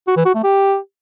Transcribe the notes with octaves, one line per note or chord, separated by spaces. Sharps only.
F#4
E3
F#4
A3
G4